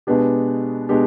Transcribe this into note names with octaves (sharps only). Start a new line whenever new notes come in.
B2 G#3 B3 D4 G4
B2 G#3 B3 D4 G4